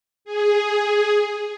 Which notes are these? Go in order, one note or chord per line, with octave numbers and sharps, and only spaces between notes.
G#4